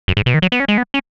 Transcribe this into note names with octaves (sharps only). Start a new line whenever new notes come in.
F#2
G#2
B2
D#3
F#3
B3
C#4
G#3
B3
C#4